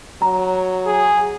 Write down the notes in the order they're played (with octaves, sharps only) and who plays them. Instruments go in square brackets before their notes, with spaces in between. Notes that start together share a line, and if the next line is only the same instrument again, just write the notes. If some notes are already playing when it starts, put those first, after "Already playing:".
[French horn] F#3 [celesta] A#5
[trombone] G#4